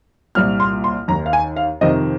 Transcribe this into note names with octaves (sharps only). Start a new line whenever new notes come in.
C2 A#2 F6
C6
C6
D#2 D#3 A#5
F5
G#5
F5
F2 C3 D#3 D#5